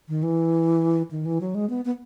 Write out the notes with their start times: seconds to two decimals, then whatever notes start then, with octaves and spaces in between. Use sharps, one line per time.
0.08 D#3
0.23 E3
1.11 D#3
1.25 E3
1.41 F#3
1.55 G#3
1.70 B3
1.85 B3